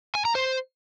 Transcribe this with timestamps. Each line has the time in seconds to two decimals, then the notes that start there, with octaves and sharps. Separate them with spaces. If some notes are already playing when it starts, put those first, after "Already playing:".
0.15 G#5
0.25 A#5
0.35 C5